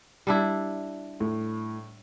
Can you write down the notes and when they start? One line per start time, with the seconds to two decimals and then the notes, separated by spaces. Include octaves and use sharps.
0.27 G3 D4 E4
1.20 A2